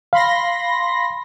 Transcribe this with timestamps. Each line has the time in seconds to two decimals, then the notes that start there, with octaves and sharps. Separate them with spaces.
0.13 F5 B5 C6 A#6